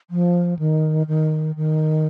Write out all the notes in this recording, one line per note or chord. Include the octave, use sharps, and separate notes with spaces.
F3
D#3
D#3
D#3